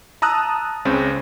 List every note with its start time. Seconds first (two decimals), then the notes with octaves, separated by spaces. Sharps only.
0.22 A5 A#5 D#6 E6 F#6
0.85 C#2 C#3 C4